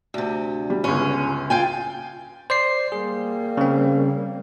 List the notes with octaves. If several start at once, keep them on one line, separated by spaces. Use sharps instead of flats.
D2 C3
G3
G1 C#2 C#4
F4 G5 G#5
C5 D5 C7
G3 A#3 G#4
C#3 C4